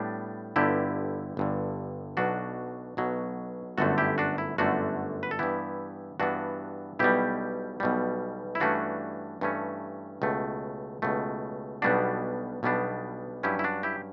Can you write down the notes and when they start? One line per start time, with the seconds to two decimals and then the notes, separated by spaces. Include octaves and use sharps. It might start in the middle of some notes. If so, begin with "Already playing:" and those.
Already playing: A2 G3 B3 D4
0.56 G1 G2 D3 E4 G4
1.37 G1 G2 D3
2.17 B1 B2 F#3 D4 F#4
2.97 B1 B2 F#3
3.78 G1 F#2 D3 A3 F#4 A4
3.98 E4 G4
4.18 D4 F#4
4.38 E4
4.58 G1 F#2 D3 A3 D4 F#4
5.23 B4
5.31 A4
5.39 G2 E3 B3 E4 G4
6.20 G2 E3 B3 D4 F#4
6.99 B1 B2 G3 E4 G4
7.80 B1 B2 G3
8.55 E4
8.60 G2 E3 A3 C#4 D4 F#4
9.41 G2 E3 A3 C#4
10.22 C#2 B2 A3
11.02 C#2 B2 A3
11.82 B1 B2 G3 B3 D4 F#4
12.63 B1 B2 G3 B3 D4
13.43 G2 F#3 C#4 E4 G4
13.59 E4
13.64 D4 F#4
13.83 E4 G4